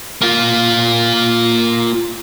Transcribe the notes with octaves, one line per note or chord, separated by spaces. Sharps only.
A#3 F4